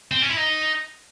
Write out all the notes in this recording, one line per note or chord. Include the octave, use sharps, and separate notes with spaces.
C4
C#4
E4
D#4